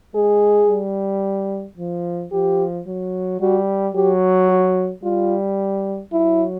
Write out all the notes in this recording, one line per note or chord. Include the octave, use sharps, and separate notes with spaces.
G#3 G#4
G3
F3
F3 G4
F#3
G3 F#4
F#3 G4
F#4
G3 F4
F#3 E4